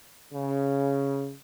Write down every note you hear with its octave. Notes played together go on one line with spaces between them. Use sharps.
C#3